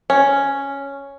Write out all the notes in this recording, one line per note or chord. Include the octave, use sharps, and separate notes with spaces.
C#4